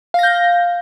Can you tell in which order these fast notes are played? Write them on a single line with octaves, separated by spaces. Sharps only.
F5 A#6 G6